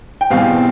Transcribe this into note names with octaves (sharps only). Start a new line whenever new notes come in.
G5
E2 B2 G3 C4 F5